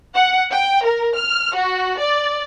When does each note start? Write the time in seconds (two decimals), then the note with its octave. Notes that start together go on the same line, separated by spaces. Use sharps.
0.15 F#5
0.51 G5
0.85 A#4
1.17 F6
1.56 F#4
1.99 D5